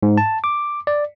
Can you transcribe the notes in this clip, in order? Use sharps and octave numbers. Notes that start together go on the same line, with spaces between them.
G#2
A5
D6
D5